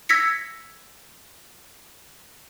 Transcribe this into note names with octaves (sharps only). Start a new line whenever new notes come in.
E6 G#6 A#6 B6 C#7